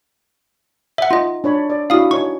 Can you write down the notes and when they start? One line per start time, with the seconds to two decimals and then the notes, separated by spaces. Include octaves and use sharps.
0.98 E5 F#5
1.11 D#4 F4 D#5
1.44 D4 C#5 B5
1.70 D5
1.90 D4 E4 F#4 F5 D#6
2.11 D#4 C#5 C#6